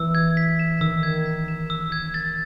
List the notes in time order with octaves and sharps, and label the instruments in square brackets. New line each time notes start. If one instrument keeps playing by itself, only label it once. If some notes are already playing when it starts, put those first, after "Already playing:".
Already playing: [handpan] E3 [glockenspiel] E6
[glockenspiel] G#6
B6
E7
[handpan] D#3 [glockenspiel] E6
[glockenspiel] G#6
B6
E7
E6
G#6
A6